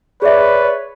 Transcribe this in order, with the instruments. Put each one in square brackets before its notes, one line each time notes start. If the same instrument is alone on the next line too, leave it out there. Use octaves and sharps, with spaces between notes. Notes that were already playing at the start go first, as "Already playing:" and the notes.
[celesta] G#4 E5 [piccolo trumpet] B4 [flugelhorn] C#5 [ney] D5